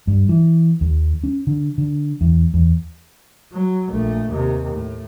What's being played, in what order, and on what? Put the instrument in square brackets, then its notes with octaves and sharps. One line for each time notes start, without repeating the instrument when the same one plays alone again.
[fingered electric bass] G2
E3
D#2
C#4
D3
D3
E2
E2
[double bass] F#3
A#1 A3
D#2 C3
A2